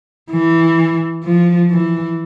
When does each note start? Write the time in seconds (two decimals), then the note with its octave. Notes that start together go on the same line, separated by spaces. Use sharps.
0.32 E3
1.24 F3
1.71 E3